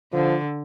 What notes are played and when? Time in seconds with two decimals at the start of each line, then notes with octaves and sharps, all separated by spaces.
0.13 D3 F3